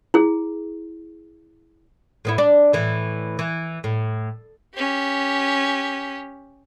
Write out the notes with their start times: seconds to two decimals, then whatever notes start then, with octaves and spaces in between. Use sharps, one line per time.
0.14 E4 G#4
2.25 A2 B3 E4
2.38 D4
2.73 A2 E3
3.39 E3
3.84 A2
4.76 C#4 G4